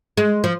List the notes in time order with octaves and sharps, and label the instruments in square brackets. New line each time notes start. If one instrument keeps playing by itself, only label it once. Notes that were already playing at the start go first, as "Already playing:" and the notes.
[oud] G#3
F3